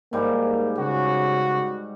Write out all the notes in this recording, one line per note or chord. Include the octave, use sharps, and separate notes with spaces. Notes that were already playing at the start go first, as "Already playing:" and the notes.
G#2 G3 A#3
C#3 F#4